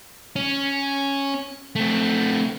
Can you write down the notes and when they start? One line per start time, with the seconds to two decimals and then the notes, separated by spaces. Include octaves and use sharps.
0.36 C#4
1.76 A3 C4